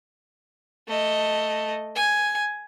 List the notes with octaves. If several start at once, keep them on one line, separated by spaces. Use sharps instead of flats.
A3 D#5
G#5